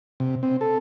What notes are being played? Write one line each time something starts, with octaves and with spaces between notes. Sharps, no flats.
C3
C4
A4